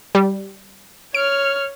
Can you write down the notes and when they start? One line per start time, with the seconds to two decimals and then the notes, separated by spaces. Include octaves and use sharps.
0.15 G3
1.15 C#5 F6 D7